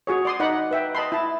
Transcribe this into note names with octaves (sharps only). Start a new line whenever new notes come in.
F#4 G#4 C#5
D5 C6 D#6
D#4 D5 F#5 B5
B4 E5 G5
D#5 A5 B5 C6
E4 A5